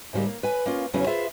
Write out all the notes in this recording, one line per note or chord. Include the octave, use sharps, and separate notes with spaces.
G#2 C#3 F3 G3 A#3
A#3
B4 G#5
A#3 C#4 F4
E2 C#3 E3 F#3 C#4 G#4
F4 G#4 B4 C5 E5 F5